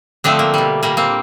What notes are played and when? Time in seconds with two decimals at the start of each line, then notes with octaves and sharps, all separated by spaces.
0.24 D3 F3 A3 C4 D4
0.39 A#3
0.54 B2 G3
0.83 A#2 G3 A#3
0.97 A#3 C4